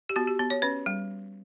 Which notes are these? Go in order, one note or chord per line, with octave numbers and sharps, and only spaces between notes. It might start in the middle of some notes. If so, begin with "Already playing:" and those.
G4
B3 F#4
G4
B3
C#5
C#4 B4
G3